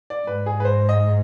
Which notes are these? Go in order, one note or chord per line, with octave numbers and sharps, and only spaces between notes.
D5
G#2 B4
G#4
B4
C5
D#5